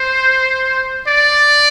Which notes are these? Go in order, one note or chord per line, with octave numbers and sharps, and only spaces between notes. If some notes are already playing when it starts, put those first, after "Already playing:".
Already playing: C5
D5